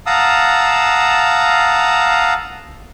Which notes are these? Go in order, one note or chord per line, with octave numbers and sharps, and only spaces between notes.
F5 F#5 A5 A#5 D#6 E6